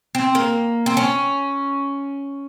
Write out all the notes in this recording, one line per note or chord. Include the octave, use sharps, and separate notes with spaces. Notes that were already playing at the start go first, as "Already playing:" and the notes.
C4
A#3
C4
C#4